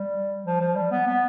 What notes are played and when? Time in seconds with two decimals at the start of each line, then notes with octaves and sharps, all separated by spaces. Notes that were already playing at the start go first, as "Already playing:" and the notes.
Already playing: G3
0.46 F3
0.61 F3
0.76 G3
0.92 B3
1.07 B3